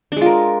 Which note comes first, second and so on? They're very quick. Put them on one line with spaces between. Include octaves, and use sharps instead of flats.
D4 G#3 F4 A#4